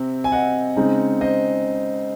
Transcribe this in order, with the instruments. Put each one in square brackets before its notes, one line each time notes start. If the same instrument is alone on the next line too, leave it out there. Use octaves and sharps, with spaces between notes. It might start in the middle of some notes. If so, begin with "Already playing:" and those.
Already playing: [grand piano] C3 C4
G#5
D#5 F#5
C#3 G#3 C4 D#4
C5 D#5